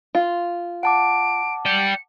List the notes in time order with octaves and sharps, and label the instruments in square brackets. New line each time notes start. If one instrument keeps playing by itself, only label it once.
[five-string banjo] F4
[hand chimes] F#5 A5 D6 [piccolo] D7
[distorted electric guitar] D5 G5 [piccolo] C#7